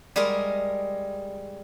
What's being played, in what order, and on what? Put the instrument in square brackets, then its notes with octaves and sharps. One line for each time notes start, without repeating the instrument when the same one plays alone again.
[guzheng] G3 G#3 G#4 A#4 D#5